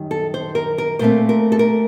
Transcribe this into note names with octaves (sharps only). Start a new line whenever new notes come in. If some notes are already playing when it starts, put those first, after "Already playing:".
Already playing: F#2 D#3 G3
A4
C5
A#4
A#4
A#2 A3 C4 C5
A#4
A4
A#4